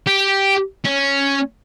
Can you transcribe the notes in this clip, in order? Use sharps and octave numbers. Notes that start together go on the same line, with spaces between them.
G4
C#4